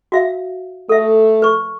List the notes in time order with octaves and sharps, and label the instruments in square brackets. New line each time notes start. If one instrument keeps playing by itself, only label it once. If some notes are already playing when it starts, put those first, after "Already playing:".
[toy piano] F#4 E5 F5
[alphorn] A3 [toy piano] A4 E5
[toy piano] B4 C#6